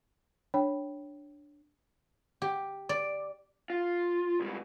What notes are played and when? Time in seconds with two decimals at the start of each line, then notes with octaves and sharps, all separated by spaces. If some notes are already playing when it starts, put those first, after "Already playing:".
0.54 D4 C#5 G5 B5
2.42 G4
2.89 D5
3.70 F4
4.40 C#2 G3